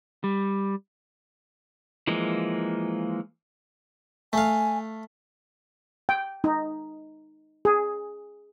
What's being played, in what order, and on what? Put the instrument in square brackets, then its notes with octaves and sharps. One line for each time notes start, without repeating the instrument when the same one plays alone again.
[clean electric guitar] G3
[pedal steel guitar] E3 F3 G#3 A#3
[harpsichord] A3 F5 [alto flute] G#5
[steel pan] G5
D#4
G#4